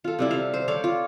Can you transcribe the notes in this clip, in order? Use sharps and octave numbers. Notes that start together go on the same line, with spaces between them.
F4 A4
C3 G3 E4
E5 F5
C5
A4 C#5 D5 F5
F4